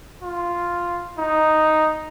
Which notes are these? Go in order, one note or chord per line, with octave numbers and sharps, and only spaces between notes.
F4
D#4